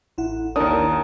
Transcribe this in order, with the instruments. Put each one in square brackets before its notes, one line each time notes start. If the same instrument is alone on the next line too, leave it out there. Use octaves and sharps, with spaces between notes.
[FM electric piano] A1 E4 F#5
[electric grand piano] D#2 D#6 [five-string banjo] D4 A#4 [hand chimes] C#5 A#5